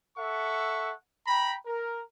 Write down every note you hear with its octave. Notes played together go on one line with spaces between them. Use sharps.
A4 E5 F#5 C#6
G5 A#5 B5
A#4